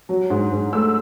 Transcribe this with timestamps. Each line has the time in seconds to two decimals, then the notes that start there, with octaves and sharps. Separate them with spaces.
0.09 F#3
0.30 G#2
0.52 G#2
0.73 A3 E6